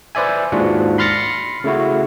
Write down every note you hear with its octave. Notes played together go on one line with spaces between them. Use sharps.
B4 C5 D5 E5 G#5
D#2 G#2 D4 F4 F#4 F#5
B5 C6 F6 A6 A#6 C#7
C#3 A3 E4 F#4